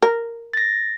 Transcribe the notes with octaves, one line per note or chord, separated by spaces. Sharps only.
A#4
A6 A#6